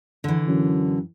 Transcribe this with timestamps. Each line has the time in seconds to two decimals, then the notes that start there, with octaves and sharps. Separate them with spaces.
0.24 D3 E3
0.48 F#2